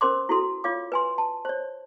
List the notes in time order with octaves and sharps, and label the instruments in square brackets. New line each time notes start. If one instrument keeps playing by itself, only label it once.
[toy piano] C#4 A#4 C5 C6 D6
E4 F#4 A4 C6
F4 C#5 F5 D6
B4 G#5 C6
A5
C5 C#5